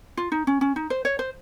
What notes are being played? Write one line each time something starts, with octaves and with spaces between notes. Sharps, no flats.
F4
D#4
C#4
C#4
D#4
C5
C#5
C5